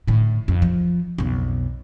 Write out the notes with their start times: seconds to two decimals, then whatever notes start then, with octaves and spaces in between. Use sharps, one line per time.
0.07 A2 D3
0.48 F2
0.62 F3
1.18 B1 F2